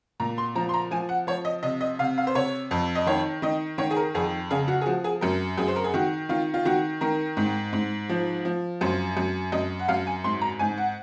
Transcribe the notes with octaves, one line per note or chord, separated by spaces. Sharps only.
A#2 A#5
C6
F3 A#5
C6
A#5
F3 G#5
F#5
F3 C#5
D#5
C3 D#5
D#5
C3 F5
F5
C5
C3 C#5
F2
D#5
D#3 C#5
D#3 D#5
D#3 C#5
G#4
A#4
F2 G#4
C#3 G#4
F#4
G#4
F3 F#4
G#4
F#2 A#4
F#2 G#4
C5
A#4
G#4
D#3 F#4
D#3 F4
F4
D#3 F#4
D#3 A#4
G#2
G#2
F3
F3
F#2 C5
F#2
F#2 D#5
F#5
F#2 F5
G#5
G#2 C6
A#5
G#2 G#5
F#5